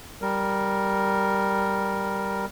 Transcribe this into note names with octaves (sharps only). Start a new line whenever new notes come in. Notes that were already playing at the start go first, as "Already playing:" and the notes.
G3 A#4